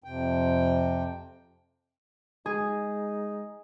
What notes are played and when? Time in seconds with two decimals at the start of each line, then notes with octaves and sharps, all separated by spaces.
0.04 F2 C3 G5
2.46 G#3 D#4 G#4